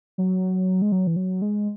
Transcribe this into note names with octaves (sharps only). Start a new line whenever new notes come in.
F#3
G#3
F#3
E3
F#3
G#3